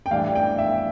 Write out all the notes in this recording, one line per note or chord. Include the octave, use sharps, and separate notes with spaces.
G5
A2 E3 G3 D4 F5
G5
E5